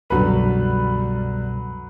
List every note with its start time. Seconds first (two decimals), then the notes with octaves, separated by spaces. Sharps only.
0.10 C2 F#2 B2 D3 F#3 G3 B4